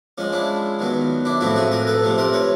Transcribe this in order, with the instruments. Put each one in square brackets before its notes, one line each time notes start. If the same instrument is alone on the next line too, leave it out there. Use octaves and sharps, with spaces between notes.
[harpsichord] F3 G#3 C#4
D4 E4
D#3 F#3 B3
D4 E4
A2 F3 A3 C4 E4 F#4
F#4 G#4
G#4 A#4
A4 B4
C3 F3 A3 C4
A#4 C5
B4 C#5